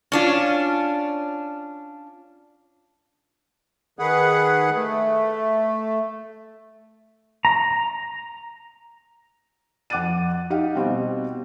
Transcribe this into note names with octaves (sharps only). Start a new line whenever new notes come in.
C#4 D4 F4
D#3 G#4 B4 F#5
A3
A#5
F2 F#5 D6 F#6 A6 D#7
D#4 G4 F5 F#5
B2 G3 C4